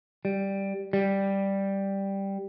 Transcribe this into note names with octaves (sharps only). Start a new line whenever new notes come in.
G3
G3